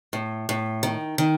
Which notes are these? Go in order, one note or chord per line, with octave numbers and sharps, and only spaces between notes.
A2
A2
D#3
D#3